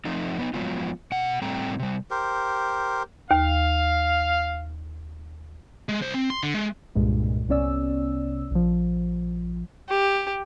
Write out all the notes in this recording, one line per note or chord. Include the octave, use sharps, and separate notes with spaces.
F3 A3 C4 D#4
B3 C#4 D#4
F3 F#3 G#3 B3 F4
B2 F#5
A2 G3 A3 C4 G5 A#5
C3 G3
G4 A#4 C5
D#2 F5
G#3
C2 C5
C4
C6
D3
G#3
C2 G2 A#2 G#3
C2 C3 B3 C#4 D5 E6
A#1 F3
G4